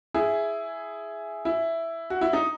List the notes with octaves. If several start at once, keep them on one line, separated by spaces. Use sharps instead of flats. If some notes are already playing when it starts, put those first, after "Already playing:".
E4 G#4
E4
F#4
E4
D#4